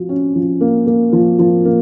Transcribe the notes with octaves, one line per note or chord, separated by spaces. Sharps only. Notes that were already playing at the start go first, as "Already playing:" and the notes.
Already playing: F3 F#4
C#4
F3
A#3
A#3
F3
F3
A#3